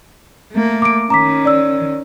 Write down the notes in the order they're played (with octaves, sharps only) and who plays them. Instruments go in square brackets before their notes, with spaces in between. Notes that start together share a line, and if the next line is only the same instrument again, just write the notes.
[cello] A3 A#3
[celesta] D6 D7
[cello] D#3 C#4 [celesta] A#5 D6 B6
[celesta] D5 E6